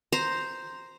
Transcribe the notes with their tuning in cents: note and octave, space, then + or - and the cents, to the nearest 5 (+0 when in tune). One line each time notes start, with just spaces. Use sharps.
C5 +0 A#5 +0